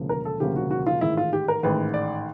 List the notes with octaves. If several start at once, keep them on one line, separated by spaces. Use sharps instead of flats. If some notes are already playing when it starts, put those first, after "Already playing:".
Already playing: E1 D2 C#3 F3 A#3
A#4
A4
E1 D2 C#3 F3 A#3 G4
F#4
F#4
F4
A1 G#2 D#3 E4
F4
G4
A#4
A1 G#2 D#3 B4
D5